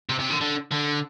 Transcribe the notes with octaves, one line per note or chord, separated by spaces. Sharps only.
C3
C3
D3
D3
D3